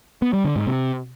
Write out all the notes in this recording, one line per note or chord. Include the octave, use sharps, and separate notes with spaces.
B3
G3
D3
G#2
C3